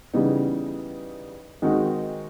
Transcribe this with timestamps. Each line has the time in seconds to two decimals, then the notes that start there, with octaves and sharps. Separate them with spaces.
0.14 C#3 E3 G3 B3 D#4
1.62 D#3 G#3 C4 D#4 F#4